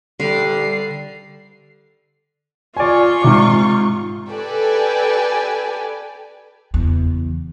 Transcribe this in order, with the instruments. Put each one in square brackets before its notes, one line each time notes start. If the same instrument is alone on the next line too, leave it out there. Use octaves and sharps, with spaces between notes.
[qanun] D3 [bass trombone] G3 [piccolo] C7
[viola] F4 C#6 [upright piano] D5 G#5
[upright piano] G#2 C3 D6
[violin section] G4 A4 B4 D5 G#5
[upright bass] F#1 E2